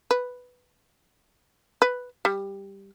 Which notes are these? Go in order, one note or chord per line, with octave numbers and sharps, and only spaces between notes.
B4
B4
G3